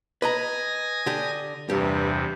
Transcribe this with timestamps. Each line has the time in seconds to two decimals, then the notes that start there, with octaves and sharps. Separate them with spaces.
0.22 B4 D#5 G#5 A#5 D#6 A#6
1.06 D3 G4
1.70 E2 G2 C3 G4